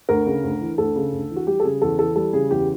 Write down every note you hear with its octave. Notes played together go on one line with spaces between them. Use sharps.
D2 A#4
C#3
D2
E3
D2 A4
C#3
D2
E3
F#4
G3 G4
A4
C#3 G#4
E2 A4
E3 A4
G3 A4
C#3 G#4
E2 G4